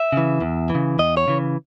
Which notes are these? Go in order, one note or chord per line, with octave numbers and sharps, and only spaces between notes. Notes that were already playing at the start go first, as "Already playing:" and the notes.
Already playing: E5
C#3 E3
E2
E3
C#3
E2 D#5
C#5
C#3 E3